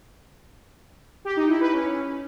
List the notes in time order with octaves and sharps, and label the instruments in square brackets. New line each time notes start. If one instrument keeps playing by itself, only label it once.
[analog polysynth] G4
D#4
E4
B4
C#4